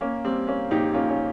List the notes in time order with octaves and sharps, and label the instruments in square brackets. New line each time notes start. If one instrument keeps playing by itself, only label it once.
[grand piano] A#3 C#4
G3 C4
A#3 C#4
A#1 D#4 G4
A#3 C#4 F4
C#4